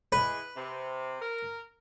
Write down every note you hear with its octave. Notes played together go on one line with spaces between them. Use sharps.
E3 G#3 B4
C3
A#4